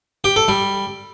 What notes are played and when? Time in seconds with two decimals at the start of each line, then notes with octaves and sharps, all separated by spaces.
0.24 G4
0.36 A4
0.48 G3